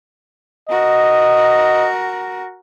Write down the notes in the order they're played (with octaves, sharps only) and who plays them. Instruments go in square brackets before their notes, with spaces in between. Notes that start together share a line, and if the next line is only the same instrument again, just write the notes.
[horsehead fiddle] F#4 A#4 [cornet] D#5